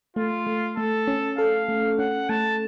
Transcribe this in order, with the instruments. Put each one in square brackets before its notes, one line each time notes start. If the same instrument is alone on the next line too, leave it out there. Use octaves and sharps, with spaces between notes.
[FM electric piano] A3 [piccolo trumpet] F4
[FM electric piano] A3
[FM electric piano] A3 [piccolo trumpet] A4
[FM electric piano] C#4
[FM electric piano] A4 [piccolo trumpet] F5
[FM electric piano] A3
[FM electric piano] C#4 [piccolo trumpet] F#5
[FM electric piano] A3 [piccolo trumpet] A5